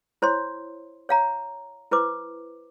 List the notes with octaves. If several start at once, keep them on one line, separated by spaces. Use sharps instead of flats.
E4 C5 C#5 C6
C#5 F5 A#5
E4 B4 C5 D6